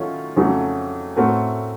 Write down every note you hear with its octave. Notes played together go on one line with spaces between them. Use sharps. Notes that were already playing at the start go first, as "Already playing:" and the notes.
Already playing: D#3 F#3 A3 C#4 F4
F2 C#3 F#3 A3
A2 A3 C4 F#4 A#4